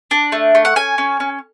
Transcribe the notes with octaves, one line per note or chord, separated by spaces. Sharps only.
D4
A3
A3
F#5
C#4 G#5
C#4
C#4